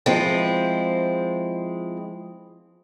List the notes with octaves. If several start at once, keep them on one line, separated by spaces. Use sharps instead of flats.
F3 G#3 C4 E4